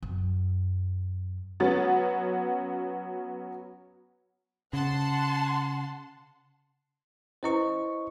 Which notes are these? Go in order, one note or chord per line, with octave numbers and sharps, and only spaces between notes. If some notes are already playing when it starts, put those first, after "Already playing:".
F#2
F#3 B3 C#4 A6
C#3 F#5 A5 C6
C#4 E4 B4 C5 D#5 C#6